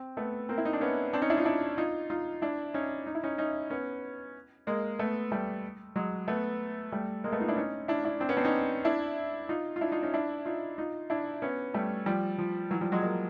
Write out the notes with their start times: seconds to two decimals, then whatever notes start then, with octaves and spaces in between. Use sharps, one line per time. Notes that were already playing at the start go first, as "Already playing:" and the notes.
Already playing: C4
0.17 A3 B3
0.49 A#3 C4
0.58 E4
0.65 D#4
0.73 D4
0.81 B3 C#4
1.13 C4 D4
1.22 C#4 D#4
1.30 D4 E4
1.38 D#4 F4
1.45 D4 E4
1.78 D#4 F4
2.10 D#4 F4
2.42 D4 E4
2.74 C#4 D#4
3.06 D#4
3.15 E4
3.23 C#4 D#4
3.38 C#4 D#4
3.70 B3 C#4
4.67 G#3 A#3
4.99 A3 B3
5.31 G3 A3
5.96 F#3 G#3
6.28 A3 B3
6.92 G3 A3
7.24 G#3 A#3
7.32 A3 B3
7.40 D#4 F4
7.48 D4 E4
7.57 C#4 D#4
7.88 D4 E4
8.05 D4 E4
8.20 C4 D4
8.29 B3 C#4
8.37 C4 D4
8.45 C#4 D#4
8.85 D4 E4
9.49 D#4 F4
9.76 F4
9.81 D4 E4
9.92 D#4 F4
10.03 C#4 D#4
10.14 D4 E4
10.45 D#4 F4
10.78 D#4 F4
11.10 D4 E4
11.42 B3 C#4
11.74 G3 A3
12.06 F3 G3
12.38 F3
12.70 E3 F#3
12.81 F3 G3
12.92 F#3 G#3
13.03 G#3 A#3